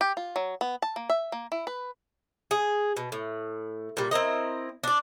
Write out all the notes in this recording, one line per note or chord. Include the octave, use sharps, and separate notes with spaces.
G4
F4
F#3
B3
A5
A#3
E5
A#3
E4
B4
G#4
B2
A2
A#2 G3
C4 E4 A#4 D#5
D4 D5